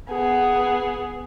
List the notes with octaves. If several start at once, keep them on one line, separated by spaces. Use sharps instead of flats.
B3 G#4